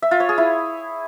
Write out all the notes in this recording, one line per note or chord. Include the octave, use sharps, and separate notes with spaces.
E5
F4
C#5
G#4
E4